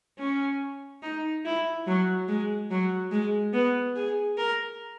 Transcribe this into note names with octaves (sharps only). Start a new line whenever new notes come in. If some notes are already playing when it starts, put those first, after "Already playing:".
C#4
D#4
E4
F#3
G#3
F#3
G#3
B3
G#4
A#4